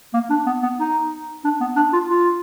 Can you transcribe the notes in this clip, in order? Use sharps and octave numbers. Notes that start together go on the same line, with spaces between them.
A#3
D4
B3
B3
D#4
D4
B3
D4
F4
F4